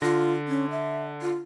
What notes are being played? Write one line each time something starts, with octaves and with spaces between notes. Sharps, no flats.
D3 F4 A#6
C#4
E5
F4